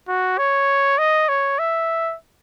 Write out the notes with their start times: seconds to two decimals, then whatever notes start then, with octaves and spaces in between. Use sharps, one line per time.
0.08 F#4
0.38 C#5
0.99 D#5
1.29 C#5
1.59 E5